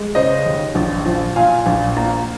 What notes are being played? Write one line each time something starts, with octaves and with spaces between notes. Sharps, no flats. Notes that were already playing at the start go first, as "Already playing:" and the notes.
Already playing: G#3
C#3 C5 D#5
D#2
A#1
F3
A#2 F5 G#5
A#1
A#3